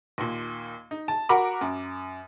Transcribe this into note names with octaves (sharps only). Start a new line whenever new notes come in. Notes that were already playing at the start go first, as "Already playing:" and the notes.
D#2 A#2
D#4
A5
F#4 A#4 F#5 A#5 B5 D6
F#2